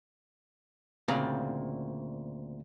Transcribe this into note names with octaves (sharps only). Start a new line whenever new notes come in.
D2 A#2 C#3 C4 D5 A#5